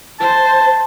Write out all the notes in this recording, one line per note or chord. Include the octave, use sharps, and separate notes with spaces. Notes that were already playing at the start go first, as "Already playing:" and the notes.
C5 A5